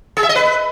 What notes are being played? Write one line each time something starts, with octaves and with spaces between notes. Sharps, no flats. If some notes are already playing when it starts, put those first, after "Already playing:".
G#4
E5
D#5
B4